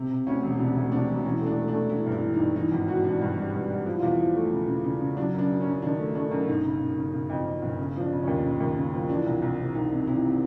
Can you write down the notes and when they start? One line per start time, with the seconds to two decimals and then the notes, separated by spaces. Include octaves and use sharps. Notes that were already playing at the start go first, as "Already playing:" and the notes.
Already playing: C3
0.10 C3
0.26 D2 C#4
0.43 E1
0.59 C3 D4
0.76 D2
0.92 C3 D4
1.08 E1
1.25 E3 C#4
1.41 A3
1.46 D4
1.57 A3
1.68 D4
1.73 A3
1.89 E3 E4
2.06 G2
2.12 E4
2.23 E3
2.33 D#4
2.39 G2
2.56 E3 D#4
2.72 G#1
2.88 E3 F#4
3.04 E3 D4
3.21 G2
3.37 G3
3.53 G2
3.70 G3
3.86 F3 E4
3.99 E2 F4
4.12 E4
4.19 F3
4.35 A3
4.52 C#3
4.68 C#3
4.84 C#3
5.01 C#3
5.16 F#3 D4
5.33 F#2
5.38 D4
5.49 F#2
5.61 C#4
5.65 F#2
5.82 D#3 D4
5.99 A3
6.15 A3 D4
6.31 F#2
6.48 G1 D#4
6.65 C#3
6.81 C#3
6.97 C#3
7.13 C#3
7.29 F2
7.46 F2
7.62 G1
7.78 C#3
7.95 F3 D4
8.11 C#3
8.22 C#4
8.27 D#2
8.44 C#3
8.60 D#2
8.77 C#3
8.93 F3
9.09 E3 D4
9.26 C2
9.42 C2
9.59 C3
9.74 C2 D#4
9.91 C3
10.07 C3 E4
10.24 C3